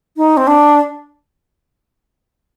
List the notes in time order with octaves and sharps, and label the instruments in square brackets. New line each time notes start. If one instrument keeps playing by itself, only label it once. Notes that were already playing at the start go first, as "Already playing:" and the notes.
[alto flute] D#4
C4
D4